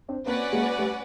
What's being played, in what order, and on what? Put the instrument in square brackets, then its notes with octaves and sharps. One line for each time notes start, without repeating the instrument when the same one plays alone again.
[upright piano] C4 D4
[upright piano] A#3 C4 [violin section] C#4 F#4 B4 D5 F#5
[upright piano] G#3 A#3
G3 A3